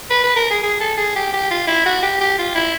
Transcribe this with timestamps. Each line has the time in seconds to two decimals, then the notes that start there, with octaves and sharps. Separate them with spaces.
0.10 B4
0.24 B4
0.36 A#4
0.50 G#4
0.63 G#4
0.80 A4
0.97 G#4
1.16 G4
1.33 G4
1.51 F4
1.67 E4
1.86 F#4
2.03 G4
2.20 G4
2.39 F4
2.55 E4